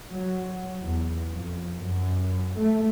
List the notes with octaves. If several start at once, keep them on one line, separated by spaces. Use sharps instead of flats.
F#3
E2
F2
F#2
A3